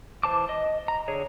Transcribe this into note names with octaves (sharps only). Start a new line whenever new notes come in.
E3 C5 A5 D6
D#5
A#5
D3 G#4 C#5